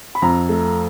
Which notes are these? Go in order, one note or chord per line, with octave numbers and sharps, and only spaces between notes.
B5
F2 A#5
A3